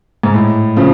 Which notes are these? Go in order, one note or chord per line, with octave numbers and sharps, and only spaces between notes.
G#2
A2
C#3 F3